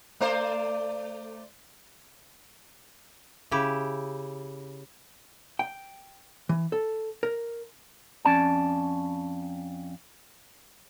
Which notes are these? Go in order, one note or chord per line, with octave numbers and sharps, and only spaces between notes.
A3 C5 D5
C#3 E4 G4
G5
E3
A4
A#4
F2 C#4 D5 A5